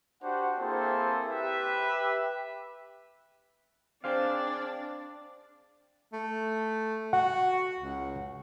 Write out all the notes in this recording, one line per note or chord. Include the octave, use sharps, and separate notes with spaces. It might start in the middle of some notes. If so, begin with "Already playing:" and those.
D4 F#4 G4 C5 F#5
A#3 C4 E4 G#4 A4 C5
G4 B4 E5
C4 D4 G#4 C5 D5 F5
A3
F#4 F#5
C#2